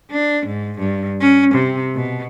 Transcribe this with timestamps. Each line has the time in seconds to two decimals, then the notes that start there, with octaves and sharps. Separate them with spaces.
0.11 D4
0.46 G#2
0.78 G2
1.21 C#4
1.54 C3
1.95 B2